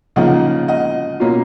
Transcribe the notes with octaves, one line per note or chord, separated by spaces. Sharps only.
C#3 F3 A#3 D#4 D#5 F#5
D#5 F#5
B2 A#3 C#4 F4